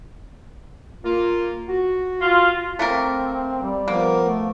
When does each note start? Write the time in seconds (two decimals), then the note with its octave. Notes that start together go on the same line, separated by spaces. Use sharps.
1.04 A#3 F4
1.68 F#4
2.21 F4
2.79 A3 A#3 C4 A#4
3.62 G3
3.88 F3 A#3 B3 A#4
4.23 A3